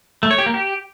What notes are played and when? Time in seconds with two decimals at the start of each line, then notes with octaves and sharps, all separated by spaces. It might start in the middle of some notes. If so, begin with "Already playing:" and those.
0.23 A3
0.31 C#5
0.38 G4
0.46 A#3
0.54 G4